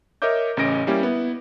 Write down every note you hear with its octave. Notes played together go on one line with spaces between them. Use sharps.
A#4 C#5 D#5 E5 D6 G6
A1 C#3 C#4 D#5 A#6 D7
G3 A#3 C#4 E4 G4
B3 E4